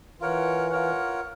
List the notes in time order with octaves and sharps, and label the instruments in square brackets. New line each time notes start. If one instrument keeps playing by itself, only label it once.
[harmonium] E3 [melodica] F4 A#4 C#5 F#5
[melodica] F4 A#4 C#5 F#5